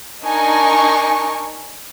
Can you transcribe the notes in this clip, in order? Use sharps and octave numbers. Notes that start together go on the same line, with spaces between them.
D4 D#4 A#4 G#5 C#6